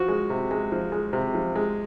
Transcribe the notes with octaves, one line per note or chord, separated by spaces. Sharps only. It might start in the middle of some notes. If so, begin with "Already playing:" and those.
Already playing: F3 F#4
G#3
C3
G#3
F3
G#3
C3
F3
G#3